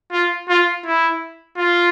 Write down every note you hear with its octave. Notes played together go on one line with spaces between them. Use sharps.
F4
F4
E4
F4